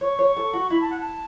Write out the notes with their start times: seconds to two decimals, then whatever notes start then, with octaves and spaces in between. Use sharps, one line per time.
0.01 C#5 C#6
0.19 C#5
0.36 A4
0.53 F#4
0.70 E4 B5
0.81 A5
0.90 F#5
1.00 A5